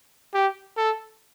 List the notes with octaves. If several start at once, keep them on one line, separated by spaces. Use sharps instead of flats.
G4
A4